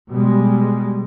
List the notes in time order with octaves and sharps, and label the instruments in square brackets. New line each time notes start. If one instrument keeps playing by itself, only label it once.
[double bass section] B2 G3 G#3